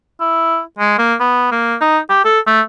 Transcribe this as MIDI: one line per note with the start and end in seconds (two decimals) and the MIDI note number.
0.20 0.60 64
0.78 0.98 56
0.98 1.15 58
1.20 1.50 59
1.51 1.75 58
1.81 1.98 63
2.09 2.22 67
2.25 2.39 69
2.47 2.61 57